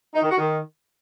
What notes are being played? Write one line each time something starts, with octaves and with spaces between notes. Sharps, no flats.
D#4
D#3
F#4
D#3